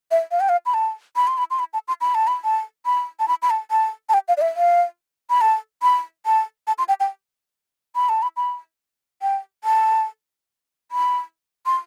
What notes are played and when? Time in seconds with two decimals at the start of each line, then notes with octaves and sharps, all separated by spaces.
0.11 E5
0.31 F5
0.40 G5
0.49 F5
0.66 B5
0.74 A5
1.16 B5
1.27 C6
1.38 B5
1.51 C6
1.59 B5
1.73 A5
1.88 C6
2.01 B5
2.15 A5
2.27 B5
2.44 A5
2.86 B5
3.20 A5
3.28 B5
3.42 B5
3.50 A5
3.71 A5
4.09 A5
4.14 G5
4.28 F5
4.37 D5
4.41 E5
4.56 F5
5.30 B5
5.41 A5
5.82 B5
6.26 A5
6.67 A5
6.78 C6
6.88 G5
7.00 G5
7.95 B5
8.09 A5
8.22 B5
8.37 B5
9.22 G5
9.64 A5
10.92 B5
11.66 C6